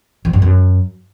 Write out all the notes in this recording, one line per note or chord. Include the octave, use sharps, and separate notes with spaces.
F3
G2
F#2